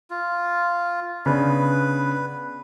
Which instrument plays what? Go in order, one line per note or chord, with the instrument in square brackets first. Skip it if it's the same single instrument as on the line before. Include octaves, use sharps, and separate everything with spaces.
[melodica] F4
[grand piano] C#3 B3 D4 [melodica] B4